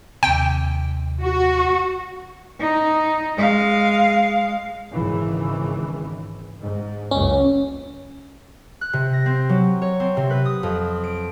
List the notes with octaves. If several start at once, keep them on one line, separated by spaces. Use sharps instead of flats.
D#2 C3 G5
F#4
D#4
G#3 F5
G#1 C#3 E3
G#2
F#1 C#2 F#2 C#4
F#6
C3
A#6
C4
F#3
C#5
C4
C3
B4
D#6
F2
D7